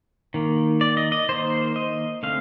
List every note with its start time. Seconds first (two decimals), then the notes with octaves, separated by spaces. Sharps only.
0.34 D#3 A#3
0.81 D5
0.97 D#5
1.12 D#5
1.29 D#3 A#3 C5
1.76 D#5
2.23 D3 A3 C4 F5